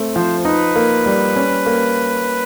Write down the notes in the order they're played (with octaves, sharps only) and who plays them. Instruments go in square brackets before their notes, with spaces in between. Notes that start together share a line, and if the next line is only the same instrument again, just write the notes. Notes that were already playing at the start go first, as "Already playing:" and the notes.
Already playing: [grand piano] A3 C4
[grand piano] F3 [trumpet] C5
[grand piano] D#4 [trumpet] B4
[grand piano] A#3
G3
C#4
A#3